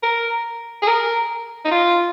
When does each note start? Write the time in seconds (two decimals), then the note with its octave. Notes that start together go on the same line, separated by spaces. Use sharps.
0.03 A#4
0.82 G#4
0.87 A#4
1.65 D#4
1.71 F4